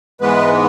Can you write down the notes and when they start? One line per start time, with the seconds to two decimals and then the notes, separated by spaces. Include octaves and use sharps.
0.21 G#2 E3 G#3 B3 B4